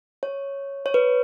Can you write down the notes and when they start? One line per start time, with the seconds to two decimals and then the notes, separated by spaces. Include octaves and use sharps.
0.23 C#5
0.86 C#5
0.94 B4